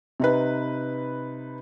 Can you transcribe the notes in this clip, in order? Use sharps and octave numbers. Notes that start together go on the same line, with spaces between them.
C3 D#4 B4